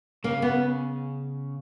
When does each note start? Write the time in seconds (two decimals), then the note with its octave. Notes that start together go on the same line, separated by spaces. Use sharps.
0.24 C#3 A#3
0.42 B3